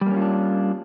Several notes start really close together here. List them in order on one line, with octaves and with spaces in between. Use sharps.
G3 A#3 C#4 F4 D4